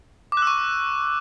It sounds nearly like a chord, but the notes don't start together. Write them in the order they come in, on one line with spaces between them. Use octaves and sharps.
D6 F#6 E6 C#6